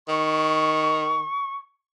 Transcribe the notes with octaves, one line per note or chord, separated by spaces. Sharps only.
D#3 C#6